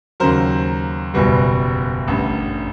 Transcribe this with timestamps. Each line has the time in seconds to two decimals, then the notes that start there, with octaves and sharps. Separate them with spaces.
0.20 D#2 C#3 F#3 A#4 C5
1.14 F#1 E2 B2 G3
2.08 A1 G2 D3